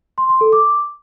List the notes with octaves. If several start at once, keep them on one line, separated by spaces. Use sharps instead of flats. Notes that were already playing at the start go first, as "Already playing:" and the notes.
C6
C6
A4
D6